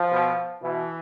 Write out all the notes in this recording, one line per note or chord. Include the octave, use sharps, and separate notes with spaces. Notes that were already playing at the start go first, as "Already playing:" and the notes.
Already playing: F3
B2
B2 E3